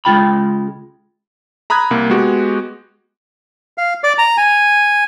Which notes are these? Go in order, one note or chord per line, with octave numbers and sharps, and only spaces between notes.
C#2 F#2 G#3 F4 G5 B5
A#5 B5 D#6 F#6 G#6
C2 A#3
G#3 B3 F#4 G4
F5
D5
A#5
G#5